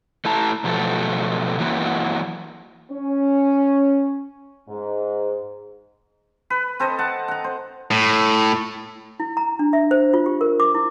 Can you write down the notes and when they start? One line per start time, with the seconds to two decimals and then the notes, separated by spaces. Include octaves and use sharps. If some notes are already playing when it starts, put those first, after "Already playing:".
0.25 A3 E4 A5 A#5
0.64 B2 F3 F#3 A3 A4
1.59 E3 F#3 A#3 F#4
2.91 C#4
4.69 G#2
6.50 B4
6.80 C4 A4 C5 D#5
6.99 F#5 A5
7.28 F#5 A#5
7.44 C5
7.91 A2
9.20 E4
9.37 A#5
9.59 D4
9.73 E5
9.91 C5
10.14 F4
10.26 G4
10.41 A#4
10.60 D6
10.75 E4